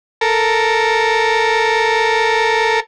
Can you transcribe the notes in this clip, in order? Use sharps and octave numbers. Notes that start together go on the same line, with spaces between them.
A4 A#4